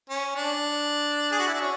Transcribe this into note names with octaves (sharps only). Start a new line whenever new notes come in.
C#4
D4
G#4
F#4
E4
D4
C#4